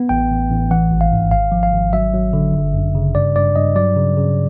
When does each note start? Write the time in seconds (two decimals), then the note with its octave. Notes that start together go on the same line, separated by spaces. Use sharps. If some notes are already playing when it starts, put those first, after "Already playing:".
Already playing: B3
0.09 A1 G5
0.30 A1
0.51 A1
0.71 E3 F#5
0.91 G#1
1.01 F5
1.12 G#2
1.32 G#1 F5
1.52 F3
1.63 F5
1.73 G#1
1.93 F#3 E5
2.14 F#3
2.33 D3
2.54 G1
2.74 F#2
2.95 C#3
3.15 G2 D5
3.36 G2 D5
3.56 G2 D#5
3.76 F#3 D5
3.96 C#3
4.17 C#3